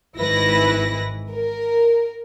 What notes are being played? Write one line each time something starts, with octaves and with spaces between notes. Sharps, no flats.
G#1 G#2 E3 E4 B4 A#6
A#4